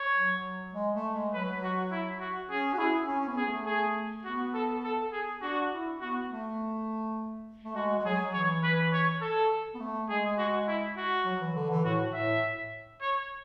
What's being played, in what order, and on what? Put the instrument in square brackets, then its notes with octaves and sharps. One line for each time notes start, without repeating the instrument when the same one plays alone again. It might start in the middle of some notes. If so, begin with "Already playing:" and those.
Already playing: [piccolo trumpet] C#5
[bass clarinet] F#3
G#3
A3
G#3
[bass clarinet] F#3 [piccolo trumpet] B4
[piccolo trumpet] F#4
E4
F#4
[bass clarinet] C#4 [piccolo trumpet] G#4
[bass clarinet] F#4
[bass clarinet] E4 [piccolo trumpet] G#4
[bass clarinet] C#4
C#4
B3
[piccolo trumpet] G#4
[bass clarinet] A3
[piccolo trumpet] G#4
[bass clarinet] B3 [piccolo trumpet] F#4
[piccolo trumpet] A4
A4
G#4
[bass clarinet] D4 [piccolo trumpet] F#4
[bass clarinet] E4
[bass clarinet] B3 [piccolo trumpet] F#4
[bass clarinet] A3
A3
[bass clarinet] G#3 [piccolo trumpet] F#4
[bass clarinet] G#3
[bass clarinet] F#3 [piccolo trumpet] G#4
[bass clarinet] E3 [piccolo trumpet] C#5
[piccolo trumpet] B4
C#5
A4
[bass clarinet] B3
A3
[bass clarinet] G#3 [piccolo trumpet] G#4
[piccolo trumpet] F#4
E4
F#4
[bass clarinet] F#3
E3
D3
E3
[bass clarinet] A2 [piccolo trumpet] F#4
[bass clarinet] A2 [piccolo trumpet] E5
[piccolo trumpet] C#5